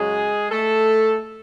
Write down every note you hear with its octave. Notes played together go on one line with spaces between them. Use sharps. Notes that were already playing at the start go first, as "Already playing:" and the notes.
Already playing: F#2 C#3 F#3 G#3 G#4
A3 A4